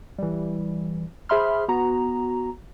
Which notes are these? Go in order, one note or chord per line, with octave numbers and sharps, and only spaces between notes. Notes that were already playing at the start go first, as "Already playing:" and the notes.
E3 G3
G#4 C5 E5 B5 C6 F6
B3 F#4 A#5